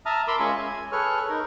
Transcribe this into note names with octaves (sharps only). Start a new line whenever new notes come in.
E5 A5 A#5 D#6 F6
A#4 B5 C6 D6 E6
G#3 C#4 F4 E5 G#5 C#6
G#5
G#4 A4 B4 C#5 C#6 F6
D#4 A#4